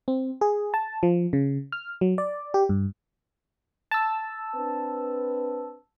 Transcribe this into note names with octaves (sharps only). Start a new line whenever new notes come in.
C4
G#4
A5
F3
C#3
F6
F#3
D5
G4
G2
A5 E6
C4 D4 B4